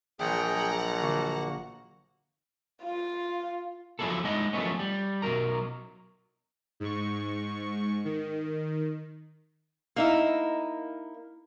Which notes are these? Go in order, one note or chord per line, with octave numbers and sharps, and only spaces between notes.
A#1 E3 F#3 G#4 F#5 G5 A#5
D3 E3 G3 A#3 F#4
F4
F3 F#3 D4 E4 G#4 A4
G#3 D#4 E4 D#5 F#5
F3 F#3 G#3 A3 B3 C#4
G3
B1 F#3 A#4 A#5
G#2 C#6
D#3
A#3 D#4 E4